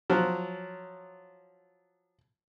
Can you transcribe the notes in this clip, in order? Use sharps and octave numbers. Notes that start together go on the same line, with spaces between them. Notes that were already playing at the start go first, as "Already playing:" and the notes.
F3 F#3